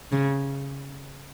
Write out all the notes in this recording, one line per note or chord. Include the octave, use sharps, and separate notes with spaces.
C#3